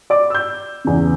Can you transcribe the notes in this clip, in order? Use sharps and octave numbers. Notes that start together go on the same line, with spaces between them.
D5 D6
E6 G6
E2 C#3